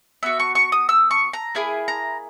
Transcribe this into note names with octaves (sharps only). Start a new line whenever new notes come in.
B3 F#4 E5
C#6
C#6
D#6
E6
C#6
A#5
A#3 E4 G#4 G#5
A#5